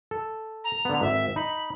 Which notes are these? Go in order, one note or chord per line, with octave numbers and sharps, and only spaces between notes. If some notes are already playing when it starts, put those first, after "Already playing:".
A4
A#5
D3 B3
G#1 E5
D#4 B5